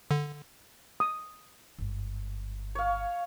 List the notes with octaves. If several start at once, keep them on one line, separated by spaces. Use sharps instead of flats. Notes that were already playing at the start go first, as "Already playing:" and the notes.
D3
D#6
G1 G#2
C#5 F5